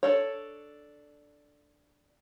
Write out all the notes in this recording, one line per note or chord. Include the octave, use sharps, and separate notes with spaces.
D4 A4 C#5